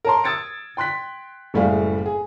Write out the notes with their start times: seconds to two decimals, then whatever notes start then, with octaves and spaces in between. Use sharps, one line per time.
0.05 A#4 C#5 A5 A#5 C6
0.24 D#6 E6 G#6 A6 C#7 D7
0.77 G5 C6 F#6 B6
1.54 F#1 A2 G3 A3 G#4 F5
2.06 G#4